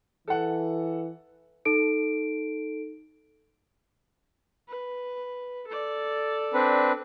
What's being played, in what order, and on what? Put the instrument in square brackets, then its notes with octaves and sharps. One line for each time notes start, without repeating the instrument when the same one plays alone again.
[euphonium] E3 [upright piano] A4 F#5
[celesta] D#4 A4 D7
[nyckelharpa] B4
A4 D5
[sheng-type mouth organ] C4 D4 B4